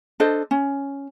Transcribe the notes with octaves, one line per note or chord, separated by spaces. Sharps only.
D4 A4 C5 D#5
C#4